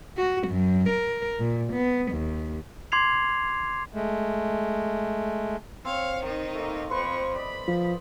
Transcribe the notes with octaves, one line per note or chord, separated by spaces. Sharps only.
F#4
F#2
A#4
A#2
B3
D#2
C6 D6 G#6 C7 F7
G#3 A3
C4 C#5 F5
D#3 D#4
A3 A#3
F2 B4 C5 C#6
D5 D#5 B5
F3